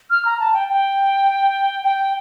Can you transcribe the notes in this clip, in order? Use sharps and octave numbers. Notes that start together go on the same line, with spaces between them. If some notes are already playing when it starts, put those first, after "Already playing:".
F6
A#5
A5
G5
G5
G5